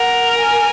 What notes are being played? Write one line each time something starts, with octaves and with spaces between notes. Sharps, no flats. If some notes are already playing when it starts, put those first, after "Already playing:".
Already playing: A#4 F#5
G#5